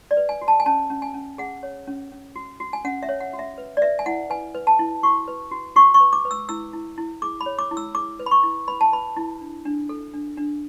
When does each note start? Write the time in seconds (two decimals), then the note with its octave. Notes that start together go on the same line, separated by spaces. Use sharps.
0.11 D5
0.17 B4
0.29 G#5
0.41 F#4
0.48 A5
0.60 G#5
0.66 C#4 A5
0.90 C#4
1.02 G#5
1.14 C#4
1.38 G#4 F#5
1.63 C#5
1.87 C#4
2.12 C#4
2.36 F#4
2.60 F#4
2.73 G#5
2.85 C#4 F#5
3.03 E5
3.09 C#5
3.21 F#5
3.33 F#4
3.39 E5
3.58 B4
3.77 D5
3.82 B4 E5
3.99 G#5
4.06 E4 F#5
4.30 B4 G#5
4.55 B4
4.67 A5
4.79 E4
5.03 F#4 C#6
5.28 B4
5.51 F#4
5.76 F#4 C#6
5.94 C#6
6.00 B4
6.13 D6
6.25 B4
6.31 E6
6.49 E4 E6
6.73 E4
6.98 E4
7.22 G#4 D6
7.41 B5
7.46 C#5
7.59 D6
7.71 E4
7.77 E6
7.95 G#4 D6
8.20 B4
8.26 B5
8.31 C#6
8.43 E4
8.68 B4 B5
8.81 A5
8.93 B4 B5
9.17 E4
9.41 D4
9.65 D4
9.89 A4
10.14 D4
10.38 D4